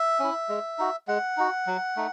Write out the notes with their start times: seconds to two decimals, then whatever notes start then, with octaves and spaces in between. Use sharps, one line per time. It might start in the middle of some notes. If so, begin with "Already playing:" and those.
Already playing: E5
0.20 C#4 E4
0.49 G#3
0.79 D#4 F#4
1.08 G#3 F#5
1.37 D#4 F#4
1.67 F#3
1.97 A3 D#4